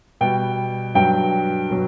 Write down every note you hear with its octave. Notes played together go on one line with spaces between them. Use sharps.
B2 G3 G5
G2 F#3 G5
B2 F#3